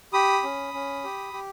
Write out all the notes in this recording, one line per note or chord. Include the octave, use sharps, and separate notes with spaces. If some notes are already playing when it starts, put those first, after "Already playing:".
G4 B5 D#6
C#4
C#4
G4
G4